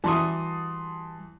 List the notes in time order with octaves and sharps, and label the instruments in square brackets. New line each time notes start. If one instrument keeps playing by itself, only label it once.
[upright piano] E3 D#6 [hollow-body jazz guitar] G3 F#4 E5 [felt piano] A5 C6